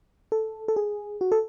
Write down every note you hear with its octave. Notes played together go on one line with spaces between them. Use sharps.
A4
A4
G#4
F#4
A4